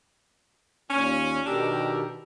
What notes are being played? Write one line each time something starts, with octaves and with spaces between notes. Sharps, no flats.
D#2 A#2 C#4
B2 D#3 D4 G4 A4 A#4